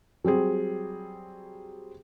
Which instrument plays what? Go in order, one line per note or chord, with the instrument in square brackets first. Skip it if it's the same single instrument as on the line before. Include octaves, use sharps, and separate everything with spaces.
[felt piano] F#3 G3 C4 G#4